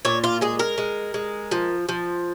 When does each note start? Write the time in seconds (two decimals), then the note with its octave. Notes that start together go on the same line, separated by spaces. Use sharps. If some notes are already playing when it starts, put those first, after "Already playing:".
0.05 A#2 C#5
0.24 F4
0.41 G#3 G#4
0.59 A#4
0.78 G#3
1.14 G#3
1.51 F3
1.89 F3